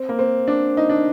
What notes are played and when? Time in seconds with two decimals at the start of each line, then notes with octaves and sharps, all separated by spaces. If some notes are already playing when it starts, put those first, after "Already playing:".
Already playing: C4
0.09 A#3
0.19 C4
0.48 D4
0.77 D#4
0.89 D4